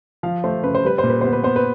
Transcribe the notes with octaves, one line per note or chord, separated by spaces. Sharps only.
F3 F5
A3 C5
C#3 B4
C5
G3 B4
C5
A#2
B4
B3 C5
B4
B3 C5
B4